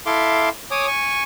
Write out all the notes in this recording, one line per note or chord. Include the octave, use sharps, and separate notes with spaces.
E4 A4 E5 F5 C6 D6
C#5 G#5 D6 D#6
G#5 C#6